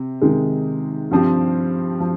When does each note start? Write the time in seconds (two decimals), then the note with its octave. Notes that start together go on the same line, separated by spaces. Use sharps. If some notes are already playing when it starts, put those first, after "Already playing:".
Already playing: C3
0.22 C3 D#3 G#3
1.11 G2 F3 C4 G4
2.00 F3